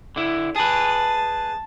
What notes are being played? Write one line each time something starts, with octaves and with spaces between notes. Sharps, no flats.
D3 E4
G#4 B4 A5